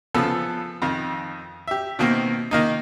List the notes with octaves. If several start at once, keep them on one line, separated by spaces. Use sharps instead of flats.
C#3 F3 B3 A4
F2 D#3
G4 E5
B2 D#3 A#3 C4
D#3 A#3 D#4